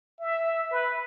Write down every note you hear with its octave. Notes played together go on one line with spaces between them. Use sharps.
E5
B4